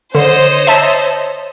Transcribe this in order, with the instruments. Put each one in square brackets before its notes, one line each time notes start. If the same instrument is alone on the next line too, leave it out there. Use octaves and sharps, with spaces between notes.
[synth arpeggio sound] D3 [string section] C5 [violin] C#5 D#5
[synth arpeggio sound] E5 A5